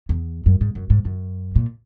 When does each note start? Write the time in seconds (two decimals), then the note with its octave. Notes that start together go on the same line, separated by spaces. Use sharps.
0.09 E2
0.46 F#2
0.61 G#2
0.75 F#2
0.90 G#2
1.05 F#2
1.56 A#2